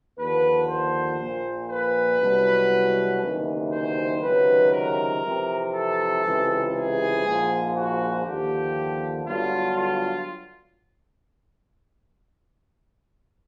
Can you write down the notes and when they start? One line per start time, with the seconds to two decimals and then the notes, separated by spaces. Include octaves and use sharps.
0.18 D#2 D3 F3 B4
0.68 C5
1.19 A#1 A#2 F3
1.70 B4
2.21 C2 B2 F#3
3.21 F#1 E2 C3 D#3
3.71 C5
4.22 C#2 C3 D#3 F#3 B4
4.72 A#4
5.23 F2 C3 E3
5.74 A4
6.23 C#2 C3 E3
6.74 G#4
7.24 A#1 G#2 F3
7.74 F#4
8.25 D#2 D3 F3 G4
9.26 G1 G2 D3 F#3 F4
9.76 F4